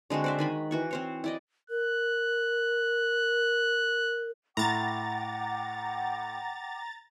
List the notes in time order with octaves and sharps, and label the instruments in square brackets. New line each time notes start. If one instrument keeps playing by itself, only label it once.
[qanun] D3 G#3 C4 F#4
C5 D5 E5
D#3 G#5 B5
E3 F#4 C#6
C4 C5 C#5
E4 D5 D#5
[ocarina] A#4 [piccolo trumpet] F#6
[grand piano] A2 [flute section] F#5 G5 D6 [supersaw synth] A#5 A6